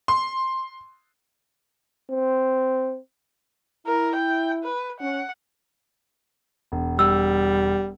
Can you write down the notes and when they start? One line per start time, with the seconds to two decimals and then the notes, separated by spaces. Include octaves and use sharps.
0.08 C6
2.10 C4
3.87 E4 A#4
4.16 G5
4.64 B4
5.00 C#4 F#5
6.72 E1
6.99 G3 E6